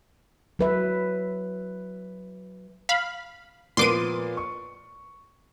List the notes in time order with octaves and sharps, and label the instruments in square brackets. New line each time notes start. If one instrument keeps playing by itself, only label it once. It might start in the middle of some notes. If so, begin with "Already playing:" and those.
[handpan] F#3 B4 E5
[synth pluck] F5 B5
[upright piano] A#2 F3 B3 [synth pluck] C6 D6 D#7
[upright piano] C#6